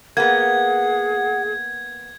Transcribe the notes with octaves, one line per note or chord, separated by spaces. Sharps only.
A#3 B3 G#4 F#5 G#6